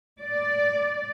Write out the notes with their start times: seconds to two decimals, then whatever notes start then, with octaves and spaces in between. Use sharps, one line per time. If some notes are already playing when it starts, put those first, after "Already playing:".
0.20 D5